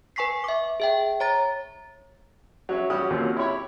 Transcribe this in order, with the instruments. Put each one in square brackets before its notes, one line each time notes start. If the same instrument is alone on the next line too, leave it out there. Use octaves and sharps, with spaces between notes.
[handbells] B4 G#5 C#6 B6 C7
E5 D6
G#4 E5 G5
C#5 A#5 A6
[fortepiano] F#3 C#4 E5
G3 C#4 F#4 G4 F#5 D#6
D#2 A#2 F#3 C4 C#4 F4
E4 G4 C#5 B5